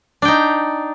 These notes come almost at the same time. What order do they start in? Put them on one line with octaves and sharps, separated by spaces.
D4 G5 D#4